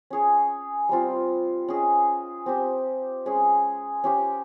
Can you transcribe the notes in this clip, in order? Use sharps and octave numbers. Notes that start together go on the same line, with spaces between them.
C#4 G#4 C#5
G3 C4 F4
C#4 G#4 D#5
C4 G4 C5
G#3 C#4 G#4
C#4 G4 C5 F5